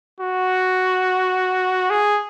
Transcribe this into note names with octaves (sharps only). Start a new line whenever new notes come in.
F#4
G#4